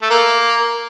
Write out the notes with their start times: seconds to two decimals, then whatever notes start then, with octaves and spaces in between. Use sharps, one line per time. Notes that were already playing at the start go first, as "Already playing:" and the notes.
0.02 A3
0.10 A#3